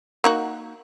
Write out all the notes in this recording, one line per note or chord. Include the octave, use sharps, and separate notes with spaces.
A#3 D#4 F#4